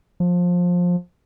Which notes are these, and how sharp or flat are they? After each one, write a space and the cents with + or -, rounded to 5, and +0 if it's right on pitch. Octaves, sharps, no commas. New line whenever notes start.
F3 +20